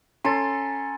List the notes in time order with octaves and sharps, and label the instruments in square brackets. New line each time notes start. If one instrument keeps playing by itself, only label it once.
[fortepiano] C#4 [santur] A4 C6 [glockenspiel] G#5 A#5 A6